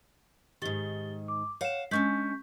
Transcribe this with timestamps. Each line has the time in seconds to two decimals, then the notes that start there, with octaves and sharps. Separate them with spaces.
0.62 G#2 D#3 G4 A6 G7
1.28 D6
1.61 C#5 F5 F#5 E7
1.91 G#3 C#4 D4 C#6 G6 B6